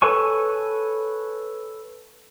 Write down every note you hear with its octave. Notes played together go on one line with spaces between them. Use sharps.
A4 B4 C#5 G#5 C#6